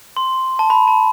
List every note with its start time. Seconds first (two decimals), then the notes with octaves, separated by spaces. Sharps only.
0.17 C6
0.59 A5
0.70 B5
0.88 A5